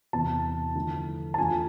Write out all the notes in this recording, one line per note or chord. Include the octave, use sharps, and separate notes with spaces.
E2 C3 E3 A5
D3 F3 A3 E4
A5
F2 E3 A3 D4 F4 G#5